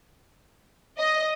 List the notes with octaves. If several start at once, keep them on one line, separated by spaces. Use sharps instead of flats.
D#5